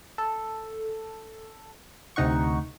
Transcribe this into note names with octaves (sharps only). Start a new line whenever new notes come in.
A4
D2 C3 D#4 F#5 C#6